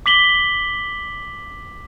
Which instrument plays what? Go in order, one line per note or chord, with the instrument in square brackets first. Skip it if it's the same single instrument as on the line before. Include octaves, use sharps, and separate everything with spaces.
[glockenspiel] D6 B6 F#7 G7